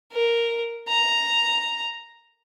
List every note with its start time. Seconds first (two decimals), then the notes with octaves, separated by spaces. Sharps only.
0.12 A#4
0.88 A#5